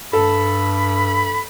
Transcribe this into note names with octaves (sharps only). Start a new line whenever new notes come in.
G2 A4 B5